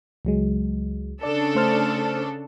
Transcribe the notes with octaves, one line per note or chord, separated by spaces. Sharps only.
C#2 F#3 G#3
C#3 D4 A4 D5
A3 C5 F6